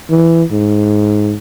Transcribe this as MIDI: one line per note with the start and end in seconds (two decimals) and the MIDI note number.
0.10 0.43 52
0.52 1.34 44